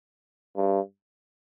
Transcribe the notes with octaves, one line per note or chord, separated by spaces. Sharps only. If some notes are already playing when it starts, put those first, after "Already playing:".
G2